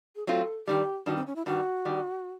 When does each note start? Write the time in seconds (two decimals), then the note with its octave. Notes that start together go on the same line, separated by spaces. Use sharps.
0.16 G#4
0.27 F#3 A3 C4 F4 A4
0.67 G2 D#3 G3 G4
1.06 G2 D#3 G3 F#4
1.16 C4
1.27 C#4
1.36 E4
1.46 G2 D#3 G3 F#4
1.85 G2 D#3 G3